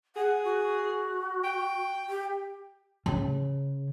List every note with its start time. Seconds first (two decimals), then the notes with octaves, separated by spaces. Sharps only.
0.16 G#4 F#5
0.45 F#4
1.44 G5
2.09 G4
3.06 C#3